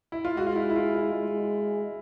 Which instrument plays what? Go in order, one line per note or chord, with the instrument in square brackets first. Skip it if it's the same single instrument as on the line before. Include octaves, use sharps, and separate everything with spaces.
[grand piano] E4
F4
[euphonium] G#3 [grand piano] F#4
[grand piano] F4
E4
E4
F4
F4
[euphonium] G#3